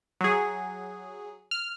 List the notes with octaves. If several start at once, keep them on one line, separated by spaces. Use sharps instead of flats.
F#3 G#4
F6